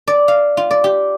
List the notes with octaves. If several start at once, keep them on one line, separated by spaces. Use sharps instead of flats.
D5
F5
F4
D5
G4